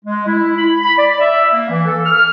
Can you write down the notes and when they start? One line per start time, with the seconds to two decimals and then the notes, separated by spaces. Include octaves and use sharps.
0.05 G#3
0.27 E4
0.57 B5
0.83 B5
0.97 D5
1.20 E5
1.52 A#3
1.70 E3
1.86 A4
2.06 F6